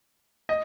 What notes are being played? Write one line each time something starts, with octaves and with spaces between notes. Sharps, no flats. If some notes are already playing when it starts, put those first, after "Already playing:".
D#5